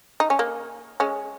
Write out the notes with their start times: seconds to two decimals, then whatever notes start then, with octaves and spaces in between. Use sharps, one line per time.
0.20 D#4
0.30 C#4
0.39 A#3
1.00 G#3 C#4